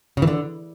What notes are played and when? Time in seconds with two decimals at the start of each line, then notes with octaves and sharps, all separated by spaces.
0.17 C#3
0.22 E3
0.27 D3